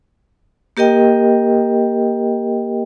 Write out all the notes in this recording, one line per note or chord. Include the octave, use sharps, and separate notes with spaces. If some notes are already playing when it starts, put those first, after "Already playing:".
A#3 G4 A#4 D#5 G5